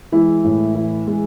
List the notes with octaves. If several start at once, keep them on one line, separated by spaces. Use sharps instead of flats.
E3 G#3 E4
A2
E3
G#3